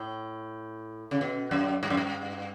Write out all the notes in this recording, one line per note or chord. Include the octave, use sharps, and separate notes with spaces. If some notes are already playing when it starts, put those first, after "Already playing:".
Already playing: A2
C#3
B2
F#2
G2
F#2
G2